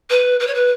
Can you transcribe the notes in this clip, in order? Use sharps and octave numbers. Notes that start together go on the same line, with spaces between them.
B4
B4
C#5
B4